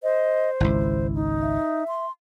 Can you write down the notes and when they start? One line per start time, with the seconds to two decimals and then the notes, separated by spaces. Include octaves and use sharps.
0.03 C5 D#5
0.60 G#1 C#2 E4
1.15 D#4
1.41 E5
1.88 C6